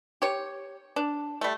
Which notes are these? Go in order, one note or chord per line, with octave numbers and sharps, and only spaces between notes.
G4 C#5
D4
G3 A3